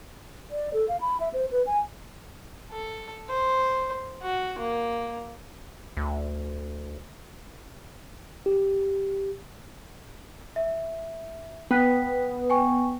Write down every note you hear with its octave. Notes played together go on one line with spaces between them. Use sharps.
D5
A4
F5
B5
E5
C5
B4
G#5
A4
C5
F#4
A#3
D2
G4
E5
B3 G5 F#6 B6
G5 G#5 C#6